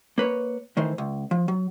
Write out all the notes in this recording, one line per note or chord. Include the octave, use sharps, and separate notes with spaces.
A#3 B4 C#5
A2 D#3 E3 C5
C#2
F3
F#3